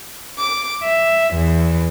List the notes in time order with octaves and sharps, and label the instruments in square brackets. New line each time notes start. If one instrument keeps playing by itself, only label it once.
[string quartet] D6
E5
E2